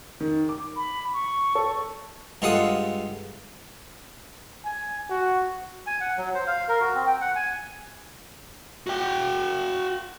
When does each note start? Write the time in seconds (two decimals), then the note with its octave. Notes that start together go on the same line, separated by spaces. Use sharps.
0.20 D#3
0.49 D6
0.76 B5
1.14 C#6
1.55 A4
2.42 G2 G#3 F4 A4 F#5 D#6
4.65 G#5
5.10 F#4
5.87 G#5
6.01 F#5
6.17 F#3
6.34 C5
6.47 F5
6.68 A#4
6.80 F#4
6.95 C4
7.07 G5
7.21 F#5
7.35 G#5
8.87 F#4 G5